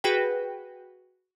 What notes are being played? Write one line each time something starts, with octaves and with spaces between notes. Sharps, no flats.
F#4 G#4 B4 G5